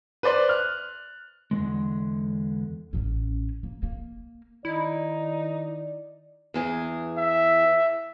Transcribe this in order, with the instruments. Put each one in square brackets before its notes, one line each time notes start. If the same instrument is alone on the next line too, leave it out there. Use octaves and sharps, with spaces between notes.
[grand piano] B4 C5 D5 C6
F6 F#6
[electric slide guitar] E2 D3 D#3 G#3
[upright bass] A1 C#4
A#3
A#3
[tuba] D#3 [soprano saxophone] D#4 [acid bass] E4 [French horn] D5
[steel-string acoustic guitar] E2 E3 G#4
[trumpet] E5